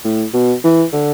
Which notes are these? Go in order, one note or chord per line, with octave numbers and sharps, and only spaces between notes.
A2
B2
E3
D3